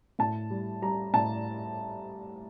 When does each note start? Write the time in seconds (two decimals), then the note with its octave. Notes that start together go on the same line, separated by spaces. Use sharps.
0.19 A2 A5
0.50 G3
0.82 G3 A#5
1.14 A2 A5